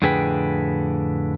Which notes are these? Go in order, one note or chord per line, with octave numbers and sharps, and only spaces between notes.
F2 A2 D3 G#4 B4 G5